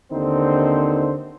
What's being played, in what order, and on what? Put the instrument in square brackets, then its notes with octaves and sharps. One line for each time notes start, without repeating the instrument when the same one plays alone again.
[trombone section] D#2 D3 C4 D#4 C5